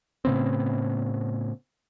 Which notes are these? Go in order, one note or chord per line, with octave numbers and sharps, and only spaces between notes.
A2 C#3 B3 C4